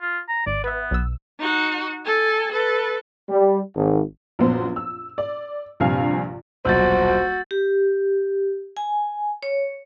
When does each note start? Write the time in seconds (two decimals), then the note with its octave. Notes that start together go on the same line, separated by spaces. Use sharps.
0.01 F4
0.29 A#5
0.46 G#1 D5
0.64 B3 B4 E5
0.91 B1 E6
1.40 D#4 F#4
2.05 A4 G#5
2.51 A4 B4
3.29 G3
3.76 G#1
4.39 A#1 F#2 B3 C5
4.76 E6
5.18 D5
5.80 A#1 G2 C3 F5 G#5
6.65 D#1 B1 F#4 C5 E6 G6 A6
7.51 G4
8.77 G#5
9.43 C#5